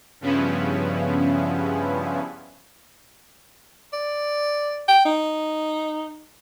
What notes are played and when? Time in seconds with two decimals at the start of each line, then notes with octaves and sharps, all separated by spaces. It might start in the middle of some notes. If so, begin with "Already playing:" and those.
0.21 G2 C#3 F3 B3 C#4 E4
3.93 D5
4.88 G5
5.05 D#4